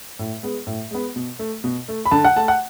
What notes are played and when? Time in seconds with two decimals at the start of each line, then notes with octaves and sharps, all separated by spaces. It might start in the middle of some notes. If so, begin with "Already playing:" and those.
0.19 A2
0.43 G#3 B3
0.67 A2
0.91 G#3 B3
1.16 B2
1.39 A3
1.64 B2
1.88 A3
2.06 B5
2.11 D3 A5
2.25 F#5
2.36 A3 A5
2.48 F#5